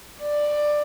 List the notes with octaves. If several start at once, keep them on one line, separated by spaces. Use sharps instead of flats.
D5